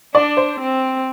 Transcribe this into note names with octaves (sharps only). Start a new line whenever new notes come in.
D4 D5
C5
C4